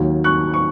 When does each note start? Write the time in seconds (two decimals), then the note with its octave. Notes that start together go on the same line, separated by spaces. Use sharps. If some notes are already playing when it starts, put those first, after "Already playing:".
Already playing: D#2 D#3 F#3
0.24 C#6 F#6
0.54 C#6